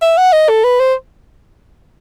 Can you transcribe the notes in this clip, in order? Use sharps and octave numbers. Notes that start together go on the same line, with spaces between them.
E5
F#5
D#5
A4
B4
C5